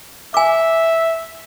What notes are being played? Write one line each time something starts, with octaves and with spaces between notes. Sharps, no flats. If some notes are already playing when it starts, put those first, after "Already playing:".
E5 G#5 D6